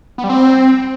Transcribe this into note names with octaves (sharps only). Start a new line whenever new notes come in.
B3
G3
C4